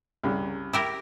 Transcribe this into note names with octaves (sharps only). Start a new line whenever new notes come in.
C2 C#3
E4 G4 A#4